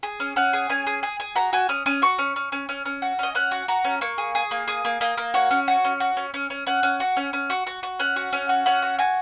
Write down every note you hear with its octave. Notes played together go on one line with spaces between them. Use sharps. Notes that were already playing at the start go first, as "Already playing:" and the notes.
G#4
C#4
C#4 F#5
G#4
C#4 G#5
G#4
G#4
G#4
F#4 A#5
F#4 G#5
C#4 D#6
C#4 D#6
F#4 C#6
C#4
C#4
C#4
C#4
C#4
F#4
C#4 D#5
C#4 F#5
F#4
F#4 A#5
C#4
A#3 C#6
G#4
G#4
A#3
G#4 D#6
A#3
A#3 D#5
A#3
F#4 C#5
C#4
F#4
C#4
F#4
C#4
C#4
C#4
C#4 F#5
C#4
F#4
C#4
C#4
F#4
F#4
F#4
C#4 F#5
F#4
C#4
F#4
C#4 F#5
F#4
F#4 G#5